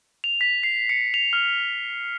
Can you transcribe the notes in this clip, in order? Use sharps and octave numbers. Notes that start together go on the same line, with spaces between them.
F7
B6
C7
C#7
F7
F6